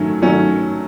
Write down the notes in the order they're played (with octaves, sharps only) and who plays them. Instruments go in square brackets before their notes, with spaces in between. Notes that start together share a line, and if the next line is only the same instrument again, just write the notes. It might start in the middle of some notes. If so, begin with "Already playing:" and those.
Already playing: [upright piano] D#3 F#3 A3 C#4
D#3 F#3 A3 C#4